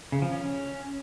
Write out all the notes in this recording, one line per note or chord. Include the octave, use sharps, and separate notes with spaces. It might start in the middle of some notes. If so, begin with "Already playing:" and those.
C#3
F3
C#4